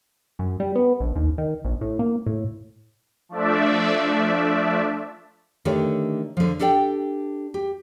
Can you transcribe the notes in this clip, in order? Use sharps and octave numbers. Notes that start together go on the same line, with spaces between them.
F#2
G3
B3
A#1
D#2
D#3
A#1
A2
A#3
A2
F3 A3 D4 D5 E5
D3 D#3 A3 G4 C#5 D5
D3 F3
D4 G4 A4 D5 F#5 G5
G4